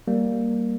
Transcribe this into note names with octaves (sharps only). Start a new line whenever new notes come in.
G3 A#3